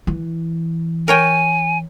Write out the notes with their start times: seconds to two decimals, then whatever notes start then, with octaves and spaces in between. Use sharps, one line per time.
0.07 E3
1.08 A#4 C#5 G5 G#5